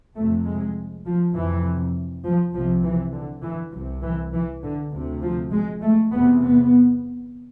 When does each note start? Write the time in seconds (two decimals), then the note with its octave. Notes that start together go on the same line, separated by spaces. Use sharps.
0.15 F2 C3 A3
0.44 G#3
1.05 F3
1.34 F2 C3 E3
2.24 F3
2.53 C2 C3 F3
2.84 E3
3.13 D3
3.42 E3
3.72 C2 C3 F3
4.03 E3
4.33 E3
4.63 D3
4.92 D2 C3
5.22 F3
5.51 G#3
5.81 A3
6.11 E2 C3 B3
6.42 B3